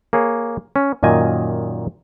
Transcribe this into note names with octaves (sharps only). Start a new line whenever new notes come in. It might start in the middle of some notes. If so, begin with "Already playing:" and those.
A#3 G#4 C#5
C#4
F#2 A#2 D#3 D#5 G#5